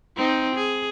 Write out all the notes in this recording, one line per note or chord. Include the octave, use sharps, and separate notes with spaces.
C4 D#4
G#4